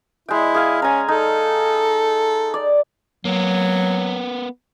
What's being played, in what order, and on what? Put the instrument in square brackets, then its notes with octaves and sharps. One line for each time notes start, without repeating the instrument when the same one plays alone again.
[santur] G#3 G5 [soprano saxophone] E4
[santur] G#4 F5 G#5
[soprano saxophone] C#4 [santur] G#5 A#5
[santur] D#4 [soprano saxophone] A4
[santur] D5
[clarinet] F#3 [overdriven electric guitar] A#3 B3